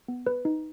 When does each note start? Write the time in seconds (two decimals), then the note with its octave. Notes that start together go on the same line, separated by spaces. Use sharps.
0.08 B3
0.27 B4
0.45 D#4